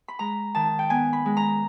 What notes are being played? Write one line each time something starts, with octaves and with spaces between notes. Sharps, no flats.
B5
G#3 A#5
D#3 A5
G5
B3 G#5
B5
G#3
A#5